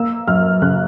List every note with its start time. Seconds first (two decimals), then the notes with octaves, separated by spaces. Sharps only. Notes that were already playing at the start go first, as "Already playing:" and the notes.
Already playing: A#3 E6
0.28 F#2 F6
0.62 C#3 F#6